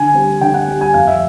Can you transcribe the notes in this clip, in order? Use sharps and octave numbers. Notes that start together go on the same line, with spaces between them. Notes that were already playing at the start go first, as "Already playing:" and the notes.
Already playing: D3 G#5
G3 C4
D3 G5
F#5
G3 C4
G#5
F2 F5
E5